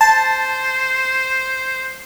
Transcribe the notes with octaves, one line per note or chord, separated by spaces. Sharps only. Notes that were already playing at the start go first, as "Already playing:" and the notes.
C5 A5